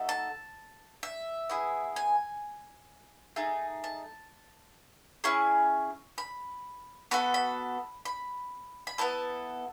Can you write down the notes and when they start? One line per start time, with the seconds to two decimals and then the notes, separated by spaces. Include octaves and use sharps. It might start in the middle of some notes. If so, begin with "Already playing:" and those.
Already playing: A3 D#4 F#4 A4
0.09 A5
1.03 E5
1.49 B3 E4 G#4
1.96 G#5
3.36 A3 D#4 G#4
3.84 A5
5.24 C#4 E4 G#4 C#6
6.18 B5
7.11 B3 F#4 A4 B5
7.34 B5
8.05 B5
8.87 B5
8.98 B3 E4 A4 A5